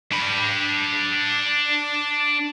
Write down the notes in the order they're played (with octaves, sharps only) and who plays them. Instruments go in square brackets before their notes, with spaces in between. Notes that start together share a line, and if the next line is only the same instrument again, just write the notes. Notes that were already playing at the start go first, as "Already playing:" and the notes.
[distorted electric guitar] D4 B5